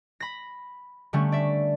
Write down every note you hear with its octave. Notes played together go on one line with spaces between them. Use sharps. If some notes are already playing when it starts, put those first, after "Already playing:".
B5 A#6
D3 G3 A3 C#4
D5 E5